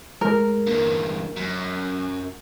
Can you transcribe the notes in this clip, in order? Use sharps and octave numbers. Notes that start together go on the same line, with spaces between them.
A2 G#3 A#4
E2 G2 A#3
F#2 F#3